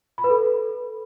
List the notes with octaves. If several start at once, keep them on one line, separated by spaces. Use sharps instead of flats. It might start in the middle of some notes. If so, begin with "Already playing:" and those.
B5
B4
A4